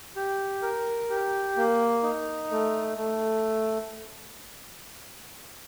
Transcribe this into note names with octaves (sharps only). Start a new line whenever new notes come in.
G4
A#4
G4
A#3
D#4
A3
A3